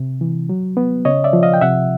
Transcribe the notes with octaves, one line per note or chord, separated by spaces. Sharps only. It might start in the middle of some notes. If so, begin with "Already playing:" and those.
Already playing: C3
E3
F#3
B3
C#3 C#5 D#5
D5 E5
F3
D#5 F5
G5
C3 E5 F#5